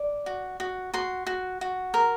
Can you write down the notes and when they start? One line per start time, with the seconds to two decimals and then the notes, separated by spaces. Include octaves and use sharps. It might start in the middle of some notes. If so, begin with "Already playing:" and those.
Already playing: D5
0.26 F#4
0.60 F#4
0.94 F#4 C6
1.27 F#4
1.61 F#4
1.94 A#4